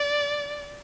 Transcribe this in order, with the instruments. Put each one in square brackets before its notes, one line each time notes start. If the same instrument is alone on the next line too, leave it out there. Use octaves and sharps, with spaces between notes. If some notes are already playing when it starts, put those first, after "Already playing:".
Already playing: [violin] D5